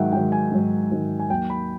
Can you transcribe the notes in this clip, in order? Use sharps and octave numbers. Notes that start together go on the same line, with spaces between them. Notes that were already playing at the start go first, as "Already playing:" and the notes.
Already playing: G#2 D#3 F#3 E5 F#5 G5
G#2 D#3 F#3 G5
G#5
G#2 D#3 F#3
G#2 D#3 F#3
G#5
D#2 D#3 F#3 G5
B5